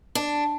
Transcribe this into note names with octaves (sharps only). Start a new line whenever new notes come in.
D4